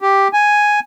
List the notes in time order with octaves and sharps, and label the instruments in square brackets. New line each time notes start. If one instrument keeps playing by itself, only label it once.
[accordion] G4
G#5